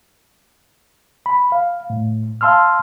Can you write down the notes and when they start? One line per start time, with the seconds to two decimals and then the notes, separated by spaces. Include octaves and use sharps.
1.26 B5
1.52 F5
1.90 A2
2.41 F5 A5 C6 E6 F6